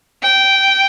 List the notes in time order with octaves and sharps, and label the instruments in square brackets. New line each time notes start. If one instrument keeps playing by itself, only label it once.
[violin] G5